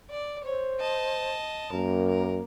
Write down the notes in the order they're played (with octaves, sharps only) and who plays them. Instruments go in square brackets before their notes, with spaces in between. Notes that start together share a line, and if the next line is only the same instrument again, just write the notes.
[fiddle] D5
[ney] C5 [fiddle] C#5
[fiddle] D#5 A5
[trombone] F#2 [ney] A#3 [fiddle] A#4
[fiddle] A#4